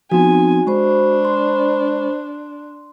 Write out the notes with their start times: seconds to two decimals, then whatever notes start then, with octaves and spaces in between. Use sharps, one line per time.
0.12 F3 B3 C4 D#4 F#4 G#5
0.67 G#3 D4 C5 B5 C#6
1.25 C6